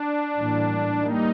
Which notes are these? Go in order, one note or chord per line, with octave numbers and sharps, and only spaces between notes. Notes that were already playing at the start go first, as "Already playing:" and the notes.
Already playing: D4
A2 E3 G3 A#3
G3 A#3 D#4